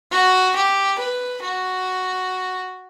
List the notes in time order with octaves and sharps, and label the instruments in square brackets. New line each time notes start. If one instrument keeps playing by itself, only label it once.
[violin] F#4
G4
B4
F#4